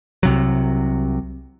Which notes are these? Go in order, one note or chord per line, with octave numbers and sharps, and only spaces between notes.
C2 C3 F#3